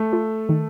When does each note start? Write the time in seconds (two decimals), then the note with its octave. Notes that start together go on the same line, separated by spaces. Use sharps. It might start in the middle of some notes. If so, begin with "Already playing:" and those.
Already playing: A3 A4
0.13 F4
0.49 D#3